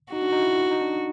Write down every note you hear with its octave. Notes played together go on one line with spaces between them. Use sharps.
D#4 F#4
D4
D#4
E4
D#4
D4